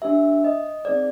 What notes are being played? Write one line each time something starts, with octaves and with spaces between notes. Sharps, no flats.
D4 G4 E5
D#5
C4 D#4 G#4 D5